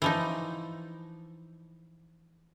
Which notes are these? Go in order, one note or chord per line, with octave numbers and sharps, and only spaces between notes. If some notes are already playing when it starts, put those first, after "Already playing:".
E3 F3 D#4